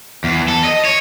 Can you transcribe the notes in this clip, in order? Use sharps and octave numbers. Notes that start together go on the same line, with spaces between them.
E2
A4
D#5
C#5